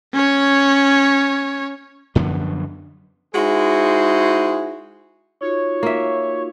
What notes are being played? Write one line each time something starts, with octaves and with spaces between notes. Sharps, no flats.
C#4 C#5
F#2 D3 F3 B3
G#3 D#4 E4 F#4 G#4 C5
D#4 F4 F#4 C#5
A#3 E5